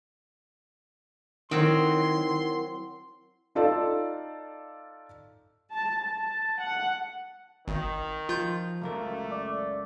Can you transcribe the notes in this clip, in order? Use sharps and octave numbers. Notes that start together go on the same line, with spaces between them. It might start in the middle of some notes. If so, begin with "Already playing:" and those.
D#3 F#3 C4 E4 A#4 F#5 C6
D#4 F4 A4 D5 F5 A5
A5
A5
F#5
G#1 D#3
F3 F4 G6
C#2 F#2 A3 A#3 A#4
D5